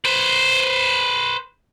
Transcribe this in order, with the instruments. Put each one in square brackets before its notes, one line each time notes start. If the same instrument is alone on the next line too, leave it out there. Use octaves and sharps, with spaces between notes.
[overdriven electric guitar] B4 C5